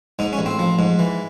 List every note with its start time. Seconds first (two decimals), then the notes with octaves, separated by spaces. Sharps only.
0.19 G#2 D#4
0.33 C#4
0.39 A1
0.46 C4
0.59 F3
0.79 G#2
0.99 E3